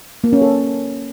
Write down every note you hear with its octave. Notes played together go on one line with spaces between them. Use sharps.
A#3
C#4
A4